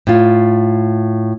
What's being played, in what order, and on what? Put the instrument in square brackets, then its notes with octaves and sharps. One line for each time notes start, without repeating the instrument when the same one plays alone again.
[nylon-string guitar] A2 F4